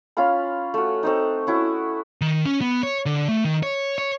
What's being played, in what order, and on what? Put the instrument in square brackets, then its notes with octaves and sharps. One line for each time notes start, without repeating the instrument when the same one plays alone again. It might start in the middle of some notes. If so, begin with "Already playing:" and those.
[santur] C#4 F4 F5 B5
A3 F#4
A3 C4 D#4
C#4 E4 F#4
[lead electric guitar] D#3
C#4
B3
C#5
D3
A3
D#3
C#5
C#5